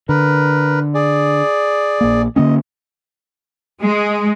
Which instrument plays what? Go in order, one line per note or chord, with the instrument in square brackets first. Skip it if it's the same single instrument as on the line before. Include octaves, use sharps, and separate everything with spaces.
[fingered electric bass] D3 [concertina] A#4 B4
[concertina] G#4 D5
[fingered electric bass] A#1 A#3
[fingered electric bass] D3 A#3 C#4 [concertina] D#5
[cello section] G#3